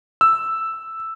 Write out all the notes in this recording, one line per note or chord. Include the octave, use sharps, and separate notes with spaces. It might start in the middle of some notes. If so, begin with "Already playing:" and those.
E6